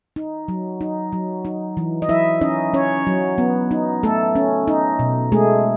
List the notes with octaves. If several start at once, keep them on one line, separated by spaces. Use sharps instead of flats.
D#4
F#3
D#4
F#3
D#4
E3
D#5
F#3 E4 E5
C#4 D#4 D#5
C#4 C#5
F#3
B3
D#4
A3 A4
C#4
D#4
B2
G#3 A3 G#4